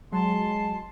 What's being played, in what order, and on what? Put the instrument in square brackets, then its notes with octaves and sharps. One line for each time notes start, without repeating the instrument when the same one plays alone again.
[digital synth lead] F#3 [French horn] G#3 [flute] A5 [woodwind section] C6